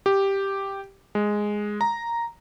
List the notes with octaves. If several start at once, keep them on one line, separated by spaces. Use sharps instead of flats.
G4
G#3
A#5